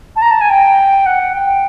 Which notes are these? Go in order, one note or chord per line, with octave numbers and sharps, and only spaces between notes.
A5
A#5
A5
G#5
G5
F#5
G5